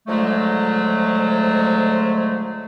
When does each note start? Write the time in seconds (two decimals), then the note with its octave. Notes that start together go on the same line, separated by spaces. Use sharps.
0.07 G#2 D3 F3 F#3 G#3 A3